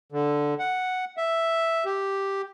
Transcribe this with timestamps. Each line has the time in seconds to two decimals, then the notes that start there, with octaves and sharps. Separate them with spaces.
0.12 D3
0.59 F#5
1.17 E5
1.85 G4